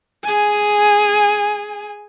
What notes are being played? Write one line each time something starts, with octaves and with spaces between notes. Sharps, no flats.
G#4 G#5